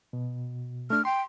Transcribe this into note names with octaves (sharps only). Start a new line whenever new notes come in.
B2
A3 D4 F6
G5 C6